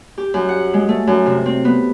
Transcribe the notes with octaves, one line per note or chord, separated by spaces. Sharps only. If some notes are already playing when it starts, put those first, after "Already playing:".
G4
F#2
F#5
G#3
A3
F#2
C3
C4
B3